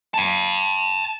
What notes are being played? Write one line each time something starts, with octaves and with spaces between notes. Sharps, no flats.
G5 A5